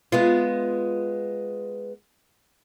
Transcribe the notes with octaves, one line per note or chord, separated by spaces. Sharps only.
G#3 B3 F4